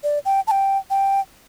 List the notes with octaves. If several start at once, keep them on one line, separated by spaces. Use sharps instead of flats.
D5
G5
A5
G5
G5